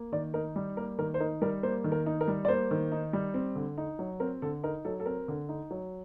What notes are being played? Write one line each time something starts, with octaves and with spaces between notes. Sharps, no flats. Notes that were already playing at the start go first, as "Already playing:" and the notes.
Already playing: A#3
D#3 D5
D#4 A#4
G3
A#3 A#4
D#3 A#4
C5
D#4 A#4
G3 A#4
A#3 C5
D#3
A#4
D#4
A#4
G3
D5
A#3 C5
D#3
D#4
G3
C4
D3
D#4
F#3
C4 A#4
D3 A4
D#4 A#4
F#3 A4
A4
C4 A#4
D3
D#4
F#3